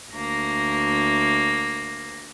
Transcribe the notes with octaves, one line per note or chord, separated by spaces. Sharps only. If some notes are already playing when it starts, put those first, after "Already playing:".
D2 A#3 A#6